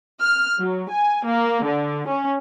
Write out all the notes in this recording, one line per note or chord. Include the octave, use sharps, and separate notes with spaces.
F6
F#3
G#5
A#3
D3
C#4